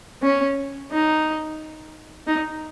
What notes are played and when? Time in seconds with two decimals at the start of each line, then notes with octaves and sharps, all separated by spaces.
0.23 C#4
0.91 D#4
2.27 D#4